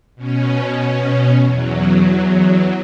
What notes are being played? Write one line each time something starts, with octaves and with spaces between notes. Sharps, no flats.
B2 C#4
E2 F#3